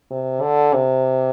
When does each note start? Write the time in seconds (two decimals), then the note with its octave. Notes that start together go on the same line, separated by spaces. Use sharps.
0.11 C3
0.42 D3
0.74 C3